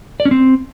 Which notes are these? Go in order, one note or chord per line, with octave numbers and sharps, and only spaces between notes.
D5
C#4
C4